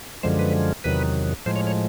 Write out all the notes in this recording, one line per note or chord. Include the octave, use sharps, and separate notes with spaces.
F#2 D3 F3 G#3 C5
B4
E2 C3 D#3 F#3 B4
A2 F3 G#3 C5
C#5
C#5